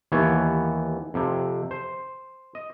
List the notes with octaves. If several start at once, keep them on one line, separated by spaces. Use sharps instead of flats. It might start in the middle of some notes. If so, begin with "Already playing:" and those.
D#2 E3 B3 G4 C#5
F2 C3
C5
D#5